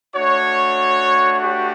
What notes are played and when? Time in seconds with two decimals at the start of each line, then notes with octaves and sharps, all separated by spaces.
0.14 A3 D4 F#4 C#5
1.43 G4